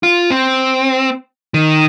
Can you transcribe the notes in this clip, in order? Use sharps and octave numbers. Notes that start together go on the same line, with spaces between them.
F4
C4
D#3